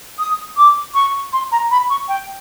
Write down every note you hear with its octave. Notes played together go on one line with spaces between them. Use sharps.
D#6
D6
C#6
C6
A#5
B5
C#6
G5